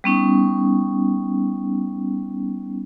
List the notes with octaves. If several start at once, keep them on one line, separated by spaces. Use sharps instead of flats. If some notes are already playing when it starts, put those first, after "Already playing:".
G3 B3 C#4 D#4